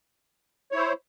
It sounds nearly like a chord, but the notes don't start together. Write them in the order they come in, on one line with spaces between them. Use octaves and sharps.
C#5 E4 C5